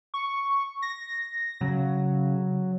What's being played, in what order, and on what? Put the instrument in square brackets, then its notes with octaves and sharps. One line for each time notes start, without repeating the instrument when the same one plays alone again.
[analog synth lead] C#6
A#6
[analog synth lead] C#3 [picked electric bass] F#3